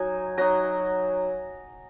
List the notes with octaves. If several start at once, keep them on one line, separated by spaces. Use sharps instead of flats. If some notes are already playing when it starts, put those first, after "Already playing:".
Already playing: F#3 D#4 G#5
F#3 D#4 A#5